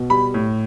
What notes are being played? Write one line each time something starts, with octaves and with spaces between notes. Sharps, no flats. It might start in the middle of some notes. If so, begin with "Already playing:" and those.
Already playing: B2
G3 B5
A2